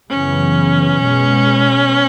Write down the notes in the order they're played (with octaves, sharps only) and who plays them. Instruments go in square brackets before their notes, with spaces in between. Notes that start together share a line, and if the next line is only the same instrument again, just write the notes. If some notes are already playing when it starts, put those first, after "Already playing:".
[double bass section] F#2 C#3 E3 B3 [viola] C#4
[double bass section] B2 G#3 B3